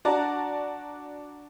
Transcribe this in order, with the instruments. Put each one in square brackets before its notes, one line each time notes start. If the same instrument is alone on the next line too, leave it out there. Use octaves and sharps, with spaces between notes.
[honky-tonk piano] D4 F#4 D5 A5 A#5